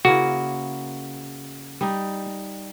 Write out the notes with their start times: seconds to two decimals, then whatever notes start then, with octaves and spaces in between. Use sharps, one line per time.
0.05 C#3 A#3 E4 F#4
1.81 G3 D#4